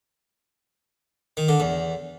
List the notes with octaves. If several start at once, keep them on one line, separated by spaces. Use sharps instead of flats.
D#3
D3
E2